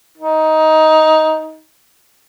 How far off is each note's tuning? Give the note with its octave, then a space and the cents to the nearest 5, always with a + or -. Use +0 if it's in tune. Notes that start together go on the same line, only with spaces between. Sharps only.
D#4 +15